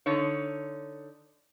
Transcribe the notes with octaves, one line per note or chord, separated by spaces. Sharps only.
D3 D#4 C#5